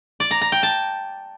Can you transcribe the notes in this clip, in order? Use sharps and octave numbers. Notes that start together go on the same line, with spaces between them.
D5
A#5
A#5
G5
A5